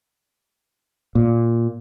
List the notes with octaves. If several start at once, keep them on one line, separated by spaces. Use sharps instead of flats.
A#2